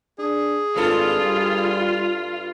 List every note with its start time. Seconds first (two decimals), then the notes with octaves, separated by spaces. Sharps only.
0.19 D4 G#4
0.76 G#1 G2 F4 A4
1.22 G3